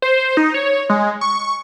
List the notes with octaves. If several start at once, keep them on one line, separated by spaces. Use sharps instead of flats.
C5
D#4
C#5
G#3
C#6